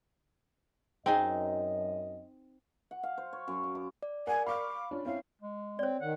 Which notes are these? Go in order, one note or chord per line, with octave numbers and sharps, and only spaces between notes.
F#2 C4 D#4 G#4 D#5
F#5
F5
C5
C#5
F#2
D6
D6
D5
A#4 D5 F#5 G#5
F5 B5 C#6 D6 F6
C#4 D4 F4
C4 C#4 E4 F5
G#3
C4 C#5 D5
D#3 F#5